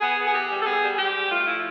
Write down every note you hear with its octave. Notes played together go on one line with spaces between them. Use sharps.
B3 G#4
B3
G#4
E3 G4
G3
A4
B3 G#4
G3
G#4
G#2 G4
G3
A3 F4
F3 E4